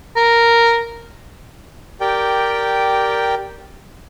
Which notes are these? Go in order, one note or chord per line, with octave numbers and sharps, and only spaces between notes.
A#4
G4 A#4 D5 G5